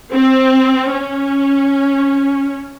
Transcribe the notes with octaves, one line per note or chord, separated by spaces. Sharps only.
C4
C#4